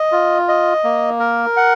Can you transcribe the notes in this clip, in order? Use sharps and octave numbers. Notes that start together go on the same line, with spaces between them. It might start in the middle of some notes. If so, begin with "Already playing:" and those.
Already playing: D#5
F4
D#5
A#3
A#4
F#5